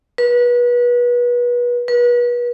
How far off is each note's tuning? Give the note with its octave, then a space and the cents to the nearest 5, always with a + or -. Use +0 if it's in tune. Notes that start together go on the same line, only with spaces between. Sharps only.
B4 -30
B4 -35